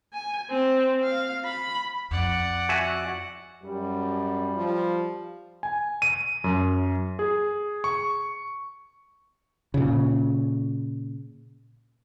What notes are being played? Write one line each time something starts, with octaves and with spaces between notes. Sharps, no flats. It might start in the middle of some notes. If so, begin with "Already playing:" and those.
G#5
C4
F5
B5
F2 D5 F#5
F#4 E5 G#5
F#2 G3
F3
G#5
D#7
F#2
G#4
C#6
A#2 C#3